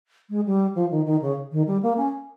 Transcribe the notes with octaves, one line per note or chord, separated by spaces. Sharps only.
G#3
G3
F3
D#3
D#3
C#3
D#3
G3
A#3
C#4